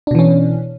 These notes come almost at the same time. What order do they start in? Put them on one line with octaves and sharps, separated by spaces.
D4 B2 E3 C#4